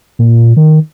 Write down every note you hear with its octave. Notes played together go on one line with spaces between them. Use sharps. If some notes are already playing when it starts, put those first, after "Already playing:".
A#2
D#3